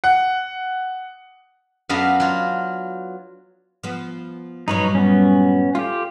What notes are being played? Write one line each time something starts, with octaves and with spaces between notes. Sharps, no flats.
F#5
F#2 B3 D4 D#5 F5
F#3 F4
F3 B3
G2 A#2 F#3 D#4 B4 C#5
B3 C#4
A3 F4 G4